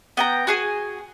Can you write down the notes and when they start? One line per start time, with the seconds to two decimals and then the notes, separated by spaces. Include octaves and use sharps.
0.17 B3 G5 A#5
0.47 F#4 G#4 G#5